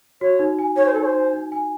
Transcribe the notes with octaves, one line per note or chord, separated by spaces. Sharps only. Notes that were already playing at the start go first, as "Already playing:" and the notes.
F#4 C#5
D#4
G#5
D#4 C#5
C5
D#4 A4
C#5
C5
D#4
D#4
G#5